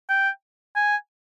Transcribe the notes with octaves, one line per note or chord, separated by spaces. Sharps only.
G5
G#5